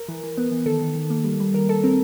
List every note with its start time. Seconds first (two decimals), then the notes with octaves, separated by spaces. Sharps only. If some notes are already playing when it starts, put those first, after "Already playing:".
Already playing: A#4
0.09 E3
0.23 E3
0.38 B3
0.51 E3
0.66 D#3 A4
0.82 D#3
0.95 D#3
1.10 A#3
1.24 G3
1.40 G3
1.54 D#3 A#4
1.68 D#3 A4
1.83 C4 A#4